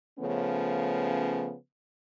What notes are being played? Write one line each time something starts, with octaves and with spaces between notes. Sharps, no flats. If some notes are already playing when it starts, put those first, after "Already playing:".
C#3 F3 A3 B3 C#4